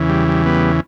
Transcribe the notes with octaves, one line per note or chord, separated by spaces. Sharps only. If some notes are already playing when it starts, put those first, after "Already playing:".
Already playing: E2 C#3 E3
G3
G3
G3 B3